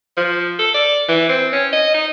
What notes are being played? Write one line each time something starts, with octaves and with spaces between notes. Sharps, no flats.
F3
A4
D5
E3
C4
C#4
D#5
D#4